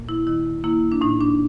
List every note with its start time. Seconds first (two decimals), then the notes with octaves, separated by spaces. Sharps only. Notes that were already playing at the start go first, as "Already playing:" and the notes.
Already playing: A#2 A#3
0.09 E4
0.27 D#3 E4
0.64 A#3 E4
0.92 D4
1.01 A2 D#4
1.21 D4